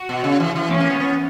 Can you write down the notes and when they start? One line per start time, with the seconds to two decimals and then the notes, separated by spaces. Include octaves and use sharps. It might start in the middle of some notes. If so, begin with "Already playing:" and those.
Already playing: F#4
0.09 B2
0.24 C#3
0.40 E3
0.56 E3
0.70 C#4
0.80 A#3
0.90 B3
1.00 B3